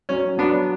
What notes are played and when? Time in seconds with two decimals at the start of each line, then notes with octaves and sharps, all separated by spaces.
0.09 F#3 C#4
0.38 F#3 B3 D4